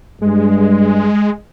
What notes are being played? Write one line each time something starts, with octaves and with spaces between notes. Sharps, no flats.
G2 G#3